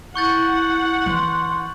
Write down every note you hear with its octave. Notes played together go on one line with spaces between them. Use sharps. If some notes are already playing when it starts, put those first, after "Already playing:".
E4 F#5 C#6 G6 A6
E3 C6